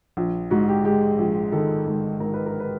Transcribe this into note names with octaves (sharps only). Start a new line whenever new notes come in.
A#1
G#2 F#4
G4
G#3 G4
A#1
D#3 A4
G#2
G#2 A#4
B4
A#4
B4